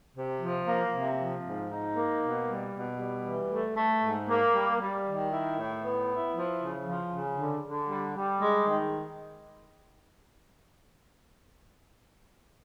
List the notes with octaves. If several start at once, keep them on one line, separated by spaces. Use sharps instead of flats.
C3
F3
A#3
C3
F3
G#2
D#4
A#3
B2
G3
B2
G3
E3
A3
A3
G#2
A#3
G3
G3
D#3
E4
A2
B3
E4
F3
C#3
F3
C#3
D3
D3
G3
G3
G#3
D#3